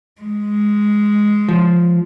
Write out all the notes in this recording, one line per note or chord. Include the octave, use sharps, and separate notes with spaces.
G#3
F3